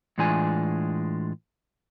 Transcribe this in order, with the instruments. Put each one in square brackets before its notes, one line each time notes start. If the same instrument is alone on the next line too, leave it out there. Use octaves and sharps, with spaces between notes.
[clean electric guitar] A2 E3 G#3 D4 F4 G#5